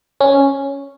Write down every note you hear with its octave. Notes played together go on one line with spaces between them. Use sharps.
C#4